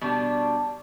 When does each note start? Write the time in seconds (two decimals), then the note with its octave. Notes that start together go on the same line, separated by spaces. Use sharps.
0.01 B2 G3 D4